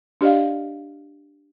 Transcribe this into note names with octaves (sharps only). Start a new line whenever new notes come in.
D4 G4 D5 D#5 F5